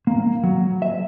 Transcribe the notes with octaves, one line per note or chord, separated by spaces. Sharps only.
A#3
F#3
E5